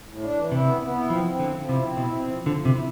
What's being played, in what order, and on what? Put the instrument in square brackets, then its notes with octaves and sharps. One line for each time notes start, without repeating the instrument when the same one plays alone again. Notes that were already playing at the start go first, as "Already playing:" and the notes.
[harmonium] A2
D4
E3
[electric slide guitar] C3 [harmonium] E4
[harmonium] B3
B3
E4
[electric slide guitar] F3 [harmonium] C4
[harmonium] C4
[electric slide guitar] D3 [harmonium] F3
[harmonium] F3
[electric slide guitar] C3 [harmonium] E4
[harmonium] C4
[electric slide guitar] B2 [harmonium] E4
[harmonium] C4
F3
[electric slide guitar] D3 [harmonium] F3
[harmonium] F3
[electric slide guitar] C3
[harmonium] E4